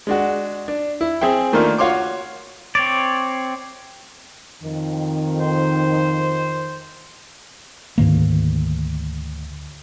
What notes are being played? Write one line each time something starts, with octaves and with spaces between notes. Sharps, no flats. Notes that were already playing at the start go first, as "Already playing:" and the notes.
G#3 D4 F#4
D4
E4
C4 G#4 E5 G5
D#3 A3 A#3 D4 F4
F4 F#4 C#5 F5 C6 D6
C4 C#5 D5
F2 D#3
C5
D2 G#2 D#3 A#3